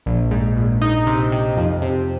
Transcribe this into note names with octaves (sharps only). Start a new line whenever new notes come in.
A#1
G#2
A#1
D#4
C3
C3
F2
C3